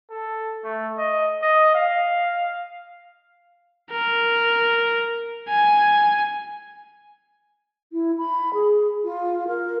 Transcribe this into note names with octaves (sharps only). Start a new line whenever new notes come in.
A4
A3
D#5
D#5
F5
A#4
G#5
E4
B5
G#4
F4
A#4